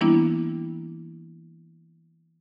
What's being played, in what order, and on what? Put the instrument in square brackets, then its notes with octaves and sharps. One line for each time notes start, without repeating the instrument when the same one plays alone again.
[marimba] E3 G3 A#3 B3 D4 E4